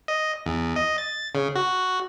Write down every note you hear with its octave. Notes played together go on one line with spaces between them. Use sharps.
D#5
E2
D#5
A6
C#3
F#4